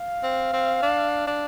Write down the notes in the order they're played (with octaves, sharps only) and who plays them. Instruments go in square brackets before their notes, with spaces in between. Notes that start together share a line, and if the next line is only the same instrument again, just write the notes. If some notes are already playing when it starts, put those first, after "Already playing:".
Already playing: [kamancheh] F5
[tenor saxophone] C4
C4
D4
D4